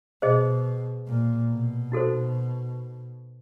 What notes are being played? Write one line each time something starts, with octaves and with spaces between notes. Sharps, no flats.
B2 G#4 C5 D#5
A#2
B2
D#4 F#4 A4 C5